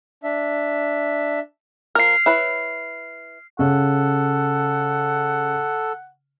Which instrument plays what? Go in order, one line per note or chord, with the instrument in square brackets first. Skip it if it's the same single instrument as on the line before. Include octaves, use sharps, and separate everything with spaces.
[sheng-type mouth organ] D4 E5
[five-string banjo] F3 A#4 [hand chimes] F6 C7
[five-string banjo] E4 B4 C#5
[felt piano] C#3 [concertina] A4 [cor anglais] F#5